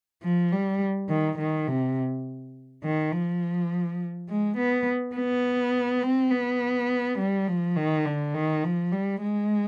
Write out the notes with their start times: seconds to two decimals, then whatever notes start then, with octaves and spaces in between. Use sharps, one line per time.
0.23 F3
0.52 G3
1.09 D#3
1.39 D#3
1.68 C3
2.84 D#3
3.13 F3
4.29 G#3
4.57 B3
5.16 B3
6.03 C4
6.31 B3
7.18 G3
7.47 F3
7.77 D#3
8.05 D3
8.34 D#3
8.64 F3
8.92 G3
9.22 G#3